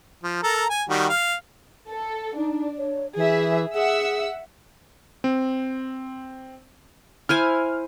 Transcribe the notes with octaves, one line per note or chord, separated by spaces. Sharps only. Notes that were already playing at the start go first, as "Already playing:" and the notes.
F3
A4 A#4 A#5
G#5
D#3 G3 F#4
F5
A4
D4 D#4
C#5
E3 G#4 E5
G#4 E5 F#5 E6
C4
E4 C5 G#5 F6